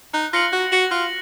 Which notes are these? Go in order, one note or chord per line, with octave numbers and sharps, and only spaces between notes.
D#4 F#6
F4 A#6 C#7 F#7
F#4 F#6
F#4 A#6 C#7 F#7
F4 F#6